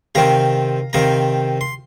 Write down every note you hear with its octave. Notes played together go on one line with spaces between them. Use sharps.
C3 D#3 C4 F5 A#5
C3 D#3 C4 F5 A#5
C6